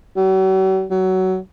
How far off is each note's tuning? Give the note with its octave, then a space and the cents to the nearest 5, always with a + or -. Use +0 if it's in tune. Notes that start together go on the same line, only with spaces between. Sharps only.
F#3 +45
F#3 +20